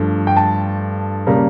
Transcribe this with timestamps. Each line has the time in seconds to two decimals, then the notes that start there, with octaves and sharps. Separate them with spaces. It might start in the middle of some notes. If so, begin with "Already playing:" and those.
Already playing: G2 F3 A3
0.27 G5
0.37 A5
1.27 C#3 G3 A#3